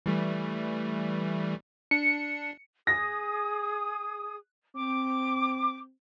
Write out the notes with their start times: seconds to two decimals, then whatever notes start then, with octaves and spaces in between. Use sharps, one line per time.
0.06 E3 G3 A3
1.91 D4 C#7
2.87 G#4 D#6 A#6
4.76 C4 D6